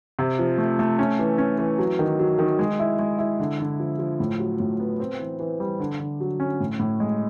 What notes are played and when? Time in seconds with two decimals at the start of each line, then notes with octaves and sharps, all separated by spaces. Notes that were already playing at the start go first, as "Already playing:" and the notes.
0.19 C3
0.39 F3
0.58 A3
0.79 A3
0.99 C#4
1.19 E3
1.38 C#4
1.58 E3
1.79 F#3
1.99 D#3
2.19 F#3
2.39 D#3
2.59 G#3
2.79 E4
2.99 G#3
3.19 E4
3.40 D3
3.60 D3
3.80 F3
3.99 F3
4.20 A2
4.40 F#3
4.60 A2
4.80 B3
5.00 C4
5.19 E3
5.40 E3
5.60 G3
5.80 D3
6.00 D3
6.20 F#3
6.40 C#4
6.60 A2
6.79 A2
7.00 G#3